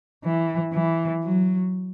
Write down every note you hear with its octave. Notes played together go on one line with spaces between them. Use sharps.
E3
E3
F#3